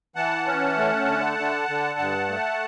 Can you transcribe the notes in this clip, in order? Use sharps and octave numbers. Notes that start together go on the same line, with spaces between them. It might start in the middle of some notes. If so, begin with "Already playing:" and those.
E3 F#5 A5
C#4
A3
D3
D3
D3
G2
A3